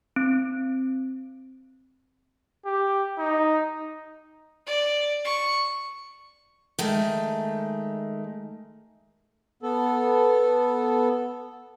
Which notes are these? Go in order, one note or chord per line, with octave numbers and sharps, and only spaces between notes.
C4
G4
D#4
D5
C#6
D#3 G#3 A3
B3 A4